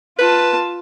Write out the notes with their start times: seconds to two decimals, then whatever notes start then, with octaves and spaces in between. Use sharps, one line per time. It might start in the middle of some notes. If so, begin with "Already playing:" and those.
0.19 F4 B4 A5